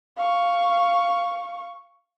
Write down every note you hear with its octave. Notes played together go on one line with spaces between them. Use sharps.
F5 C#6